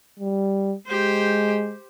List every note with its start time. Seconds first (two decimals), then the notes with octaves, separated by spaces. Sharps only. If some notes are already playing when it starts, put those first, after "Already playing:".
0.20 G3
0.87 G#3 G4 C5